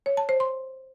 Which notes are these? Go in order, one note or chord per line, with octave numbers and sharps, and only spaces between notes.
C#5
A5
C5
C6